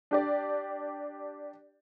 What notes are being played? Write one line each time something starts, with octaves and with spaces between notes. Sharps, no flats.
D4 G4 D5